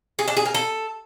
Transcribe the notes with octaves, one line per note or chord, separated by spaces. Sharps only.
G#4
D4
G#4
A#4
A4